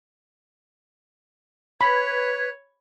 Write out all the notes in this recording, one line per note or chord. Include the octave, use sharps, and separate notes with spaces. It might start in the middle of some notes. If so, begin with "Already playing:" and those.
B4 C#5 B5 G#6